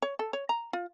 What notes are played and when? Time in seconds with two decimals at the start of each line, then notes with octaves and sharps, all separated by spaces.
0.02 C#5
0.19 A4
0.33 C#5
0.49 A#5
0.73 F4